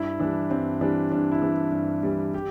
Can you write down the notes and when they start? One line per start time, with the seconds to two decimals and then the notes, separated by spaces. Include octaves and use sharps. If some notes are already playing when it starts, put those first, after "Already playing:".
Already playing: G2 E4
0.19 E3 G3 D4
0.50 G2 C4
0.81 E3 G3 D4
1.12 G2 D4
1.31 E4
1.42 E3 G3
1.72 G2
2.03 E3 G3
2.34 G4